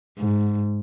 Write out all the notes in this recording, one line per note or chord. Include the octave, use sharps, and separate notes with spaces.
G#2